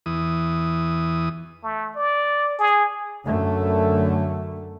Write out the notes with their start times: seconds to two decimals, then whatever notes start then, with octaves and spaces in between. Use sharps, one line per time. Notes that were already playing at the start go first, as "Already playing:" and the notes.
0.06 E2 E3 D#6
1.63 A3
1.96 D5
2.59 G#4
3.24 F#2 D3 A3